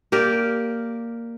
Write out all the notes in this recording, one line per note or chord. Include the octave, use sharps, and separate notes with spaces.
A#3 G4 A#4 D5